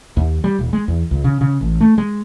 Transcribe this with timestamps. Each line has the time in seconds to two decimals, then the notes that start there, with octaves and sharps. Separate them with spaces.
0.17 D#2
0.44 G3
0.59 D#1
0.73 G#3
0.88 E2
1.11 C#2
1.24 C#3
1.41 C#3
1.61 A1
1.81 A3
1.98 G#3